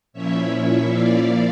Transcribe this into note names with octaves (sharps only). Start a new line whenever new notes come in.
A#2 F3 C#4 E4 C#5 E5
F3 A#3 E4 D5 F5